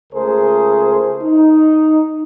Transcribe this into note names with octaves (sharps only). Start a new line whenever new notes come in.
C#2 A3 G#4 A#4 C5
D#4